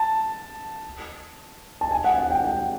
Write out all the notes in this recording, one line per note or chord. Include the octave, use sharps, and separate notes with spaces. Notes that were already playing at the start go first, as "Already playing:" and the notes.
Already playing: A5
A5
G#5
F#5
F#5
G5
G5